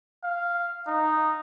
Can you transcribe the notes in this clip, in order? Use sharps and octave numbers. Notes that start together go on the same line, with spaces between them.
F5
D#4